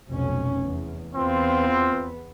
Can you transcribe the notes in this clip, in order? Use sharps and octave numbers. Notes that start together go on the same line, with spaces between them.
F1 B1 C#4
E2
E2 B3 C4 F4